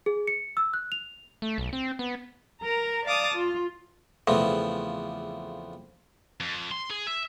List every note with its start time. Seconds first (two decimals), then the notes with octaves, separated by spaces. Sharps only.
0.06 G#4
0.27 C#7
0.57 E6
0.74 F#6
0.92 F7
1.42 A3
1.58 B1
1.73 C4
1.99 B3
2.62 A#4 A#5
3.05 D5 F5 A5 D6 D#6
3.35 F4
4.28 E2 C#3 F3 A3 B3 C4
6.40 F2
6.71 C6
6.91 G#4
7.07 E5